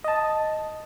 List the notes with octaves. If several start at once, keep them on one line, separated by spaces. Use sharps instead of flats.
D#5 A5